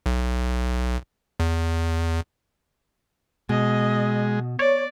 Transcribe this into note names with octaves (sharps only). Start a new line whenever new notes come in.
B1
E2
B2 G#3 D#5
C#5 D5